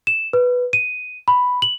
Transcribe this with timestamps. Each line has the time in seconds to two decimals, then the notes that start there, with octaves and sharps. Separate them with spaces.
0.07 E7
0.33 B4
0.73 D#7
1.28 B5
1.62 F#7